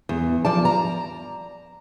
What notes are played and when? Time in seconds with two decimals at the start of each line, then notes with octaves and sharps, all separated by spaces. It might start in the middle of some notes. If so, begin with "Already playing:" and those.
0.09 E2
0.45 F3 D5 A5
0.65 A#5